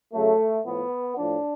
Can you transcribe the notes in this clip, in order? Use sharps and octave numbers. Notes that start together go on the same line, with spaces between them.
C#3 F#3 A3
A2 F3 B3
A2 F3 D4